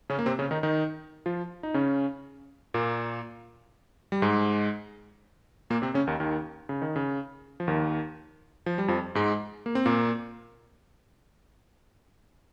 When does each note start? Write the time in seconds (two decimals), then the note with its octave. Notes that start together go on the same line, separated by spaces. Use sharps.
0.10 C#3 C#4
0.19 A#3
0.26 C3 C4
0.39 C#3 C#4
0.51 D#3 D#4
0.63 D#3 D#4
1.26 F3 F4
1.63 D#4
1.74 C#3 C#4
2.74 A#2 A#3
4.12 G3
4.22 G#2 G#3
5.70 A#2 A#3
5.82 C3 C4
5.94 C#3 C#4
6.07 D#2 D#3
6.20 D#2 D#3
6.69 C#3
6.82 D#3
6.96 C#3
7.60 F3
7.68 D#2 D#3
8.66 F3
8.78 G3
8.88 F2 F3
9.15 G#2 G#3
9.66 A#3
9.75 C4
9.86 A#2 A#3